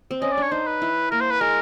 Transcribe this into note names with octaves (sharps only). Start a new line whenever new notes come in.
C4
C#4 D#5
D5
D4 C#5
D#4 C5
B4
E4
A#3 A#4
C5
B4
G#3 A#4